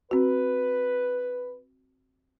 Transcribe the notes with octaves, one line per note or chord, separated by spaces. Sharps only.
C4 F#4 B4